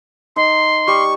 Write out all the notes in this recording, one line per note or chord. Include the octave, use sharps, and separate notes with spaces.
D#4 C6
G3 C#6